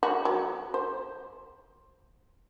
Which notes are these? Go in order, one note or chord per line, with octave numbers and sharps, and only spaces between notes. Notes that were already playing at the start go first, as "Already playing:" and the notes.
F#4
F#3
C5